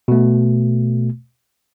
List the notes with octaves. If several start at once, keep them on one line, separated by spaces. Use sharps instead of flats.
B2 A3